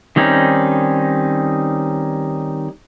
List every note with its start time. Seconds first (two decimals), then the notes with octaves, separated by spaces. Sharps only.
0.16 D#3 G3 C4 C#4 D#4